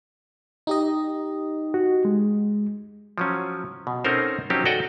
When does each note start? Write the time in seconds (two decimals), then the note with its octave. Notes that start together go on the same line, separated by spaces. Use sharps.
0.67 D#4 G4 D#5
1.74 F#4
2.05 G#3
3.18 F3 F#3 C#4
3.87 B2
4.04 C4 C#4 D#4 A4 A#4 C5
4.50 F3 F#3 C4 C#4 D#4 G4
4.66 F#4 A4 D5 D#5 G5